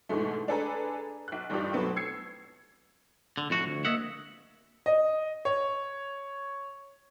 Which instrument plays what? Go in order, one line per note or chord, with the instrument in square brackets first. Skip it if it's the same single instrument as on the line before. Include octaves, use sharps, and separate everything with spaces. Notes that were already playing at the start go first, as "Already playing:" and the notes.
[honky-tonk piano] G#2 B2 E3 G#3 A3
D4 G#4 A4 B4 G#5 A#5
B1 F#6
A1 G2 A#2 D#4 G4 D5
B2 F#3 A3 B3 C4
E6 G#6 C7 C#7
[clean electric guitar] D3
F2 A2 F#4
D2
A#3 D#5 E5 F#5
[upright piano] D#5
C#5